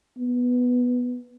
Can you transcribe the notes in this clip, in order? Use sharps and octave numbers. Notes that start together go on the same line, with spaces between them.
B3